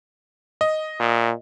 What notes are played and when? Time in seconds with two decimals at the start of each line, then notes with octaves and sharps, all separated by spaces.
0.61 D#5
1.00 A#2